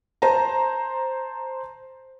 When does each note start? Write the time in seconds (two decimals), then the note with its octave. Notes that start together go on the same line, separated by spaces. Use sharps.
0.22 C5 A5 A#5